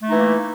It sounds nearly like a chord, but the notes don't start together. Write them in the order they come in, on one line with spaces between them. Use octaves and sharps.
A3 D#4 E3 A#3